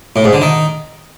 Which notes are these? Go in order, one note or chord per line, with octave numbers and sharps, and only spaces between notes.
A2
G#2
D3
D#3